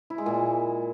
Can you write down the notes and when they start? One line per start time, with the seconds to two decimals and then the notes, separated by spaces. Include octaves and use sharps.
0.10 E4
0.18 G#3
0.26 A#2